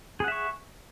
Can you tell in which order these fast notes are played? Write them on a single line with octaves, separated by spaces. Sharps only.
G#4 F#5 E5 C#6